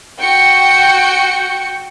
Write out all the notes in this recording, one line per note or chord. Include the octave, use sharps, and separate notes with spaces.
F#4 G5 C#7